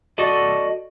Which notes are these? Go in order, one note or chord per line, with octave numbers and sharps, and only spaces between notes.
F#4 A4 D5 D#5